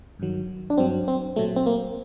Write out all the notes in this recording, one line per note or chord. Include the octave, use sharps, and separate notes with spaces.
G2 D#3 F#3
D4
G2 F#3 C4
C4
A#2 F#3 A3
C4
A#3